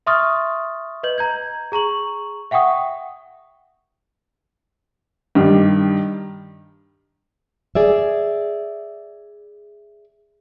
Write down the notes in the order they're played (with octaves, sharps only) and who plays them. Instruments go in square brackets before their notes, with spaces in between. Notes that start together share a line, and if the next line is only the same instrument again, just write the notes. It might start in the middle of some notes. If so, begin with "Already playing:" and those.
[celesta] E5 C6 C#6 D#6 F6 A6
B4 D#5 G6 F#7
A#5 G6 G#6
G#4 A#5 C#6 F#7
E5 F#5 G5 C#6 D#6
[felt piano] G2 D#3 G3
[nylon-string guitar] G#4 D5 E5